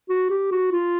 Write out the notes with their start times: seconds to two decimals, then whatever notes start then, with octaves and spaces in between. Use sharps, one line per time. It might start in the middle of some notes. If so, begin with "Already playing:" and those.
0.09 F#4
0.30 G4
0.52 F#4
0.72 F4